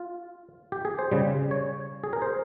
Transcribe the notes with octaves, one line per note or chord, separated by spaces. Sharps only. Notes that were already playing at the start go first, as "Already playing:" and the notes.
Already playing: F4
G4
G#4
C5
C#3 G3
C#5
G#4
A#4
C5